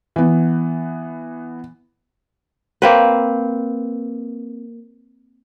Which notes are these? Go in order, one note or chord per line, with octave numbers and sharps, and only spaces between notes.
E3 B3
A#3 C4 B4